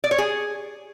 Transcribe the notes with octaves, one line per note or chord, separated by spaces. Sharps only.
D5
C#5
G#4